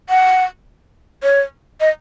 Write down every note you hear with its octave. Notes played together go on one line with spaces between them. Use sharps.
F#5
C#5
D#5